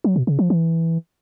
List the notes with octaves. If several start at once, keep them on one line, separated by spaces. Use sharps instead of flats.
F#3
B2
C#3
F3
E3